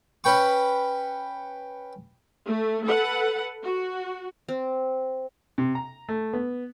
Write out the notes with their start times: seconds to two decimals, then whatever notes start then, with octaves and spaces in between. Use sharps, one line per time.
0.24 C#4 B4 G5 C#6
2.46 A3
2.86 A4 B4 F#5
3.63 F#4
4.48 C4
5.58 C3
5.75 A#5
6.09 A3
6.33 B3